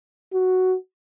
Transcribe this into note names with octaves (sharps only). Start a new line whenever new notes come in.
F#4